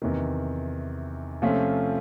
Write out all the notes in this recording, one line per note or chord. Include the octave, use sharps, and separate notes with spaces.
E2 C3 D#3
C3 F3 A3 C#4 F4